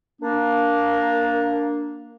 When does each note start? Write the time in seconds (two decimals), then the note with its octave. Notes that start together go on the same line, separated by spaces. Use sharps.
0.21 A#3 D4